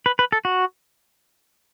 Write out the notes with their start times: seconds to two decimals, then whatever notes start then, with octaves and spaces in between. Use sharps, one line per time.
0.06 B4
0.19 B4
0.32 A4
0.45 F#4